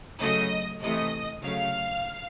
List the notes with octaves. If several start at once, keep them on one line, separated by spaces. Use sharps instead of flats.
C#3 F#3 A3 D#5
C3 E3 A3 D#5
C#3 F#3 A3 F5